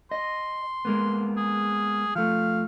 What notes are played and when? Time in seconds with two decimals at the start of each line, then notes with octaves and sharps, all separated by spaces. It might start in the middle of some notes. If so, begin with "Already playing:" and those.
0.11 D#5 C6
0.85 G#3 A#3 B3
1.37 G#4
2.15 F3 A3 F5